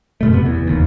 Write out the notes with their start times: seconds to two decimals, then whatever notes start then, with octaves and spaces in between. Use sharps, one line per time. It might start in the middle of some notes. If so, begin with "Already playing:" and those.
0.21 F#2 B2 A3
0.33 C3 B3
0.45 E2
0.67 F1 D#2